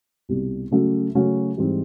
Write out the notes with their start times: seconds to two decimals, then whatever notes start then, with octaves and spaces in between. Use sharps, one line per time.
0.29 C2 B2 G3
0.71 C#3 F#3 A3 C#4 F#4
1.15 C#3 F#3 A3 C#4 F#4
1.58 G#2 E3 G3 C4 D#4